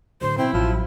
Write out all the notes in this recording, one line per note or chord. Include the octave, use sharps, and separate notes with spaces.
A2 D3 F#3 C5
B2 C4 E4
A1 F3 F#3 B5